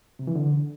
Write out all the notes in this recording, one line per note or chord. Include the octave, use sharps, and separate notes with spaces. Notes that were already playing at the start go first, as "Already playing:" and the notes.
C3
E3
D3